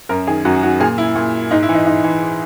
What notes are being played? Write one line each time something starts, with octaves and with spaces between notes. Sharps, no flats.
F#2 A#4
D#3 G#4
F#2 F#4
D#3 F#4
A#2 G#4
E4
A#2
G#2 D#4
E4
E3
D#4
G#2 D#4
E3